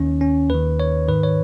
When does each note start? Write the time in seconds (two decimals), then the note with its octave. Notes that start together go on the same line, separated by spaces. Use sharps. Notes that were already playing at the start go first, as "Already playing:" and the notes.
Already playing: D#2 D#3 C#4
0.21 C#4
0.49 D#2 D#3 B4
0.80 C#5
1.08 G#2 D#3 B4
1.23 C#5